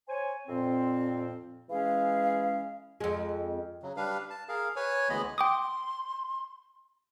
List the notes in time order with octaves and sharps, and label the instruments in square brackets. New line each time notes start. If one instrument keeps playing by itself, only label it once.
[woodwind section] C5 C#5 G#5
F2 A#2 C4
E3 G#3 C#4 G#4 F5
[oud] F2 G#3
[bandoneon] C#3 F#3
G3 D4 B4 F5
A5
G#4 A#4 F5
B4 C#5 G#5
D2 E3 G#3 B3 D#5 B5
[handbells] G5 D6 D#6 [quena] C6